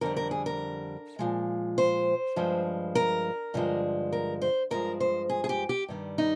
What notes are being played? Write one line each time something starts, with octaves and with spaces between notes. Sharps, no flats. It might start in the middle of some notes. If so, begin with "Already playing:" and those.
F2 D3 G3 A#4
A#4
G#4
A#4
A#2 F3 G#3
C5
G2 F3 G#3
A#4
G2 D3 F3 G#3
A#4
C5
G2 F3 G#3 A#4
C5
G#4
G#4
G4
G4
G2 D#3 G3
D#4